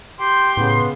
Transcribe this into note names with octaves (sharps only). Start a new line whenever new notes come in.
G4 G5 C6
A2 C#3 B3